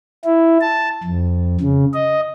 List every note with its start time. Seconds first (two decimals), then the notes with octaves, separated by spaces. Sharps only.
0.25 E4
0.61 A5
1.04 F2
1.60 C#3
1.94 D#5